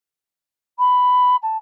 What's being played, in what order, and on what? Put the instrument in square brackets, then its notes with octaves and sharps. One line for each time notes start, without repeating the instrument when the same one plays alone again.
[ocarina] B5
A5